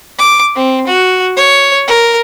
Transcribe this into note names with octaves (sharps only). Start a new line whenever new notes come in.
D6
C4
F#4
C#5
A#4